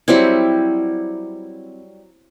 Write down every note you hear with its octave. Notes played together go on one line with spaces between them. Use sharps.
F#3 G3 C4 E4